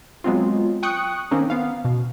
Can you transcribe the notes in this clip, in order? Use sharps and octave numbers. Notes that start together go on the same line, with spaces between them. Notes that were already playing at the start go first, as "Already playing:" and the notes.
F#3 G#3 B3 C4 F4
G5 C#6 D#6 F#6 C#7
D#3 A#3 C4 C#4 D#4
B3 F5
B2